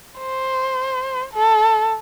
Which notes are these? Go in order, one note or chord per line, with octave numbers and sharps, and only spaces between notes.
C5
A4